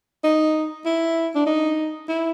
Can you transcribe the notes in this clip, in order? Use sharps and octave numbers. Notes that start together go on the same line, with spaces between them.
D#4
E4
D4
D#4
E4